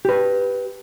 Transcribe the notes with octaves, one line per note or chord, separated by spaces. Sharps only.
G4 B4